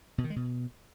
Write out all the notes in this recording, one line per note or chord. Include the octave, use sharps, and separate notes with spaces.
B2
D#3
G#3
B2